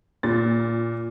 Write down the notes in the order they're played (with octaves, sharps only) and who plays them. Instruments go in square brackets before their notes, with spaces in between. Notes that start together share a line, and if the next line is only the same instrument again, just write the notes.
[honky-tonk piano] A#2 A6